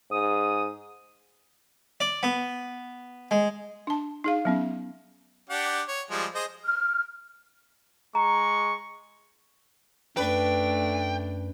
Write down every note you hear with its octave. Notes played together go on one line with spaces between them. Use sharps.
G#2 D#6
D5
B3
G#3
D4 A5
D#4 G#4 F5
F#3 B3 C#4
D4 G4 F#5
C#5
F3 G3 G#3
G#4 C5 D#5
F6
G#3 A#5 C#6
F#2 A3 D4 B4 G5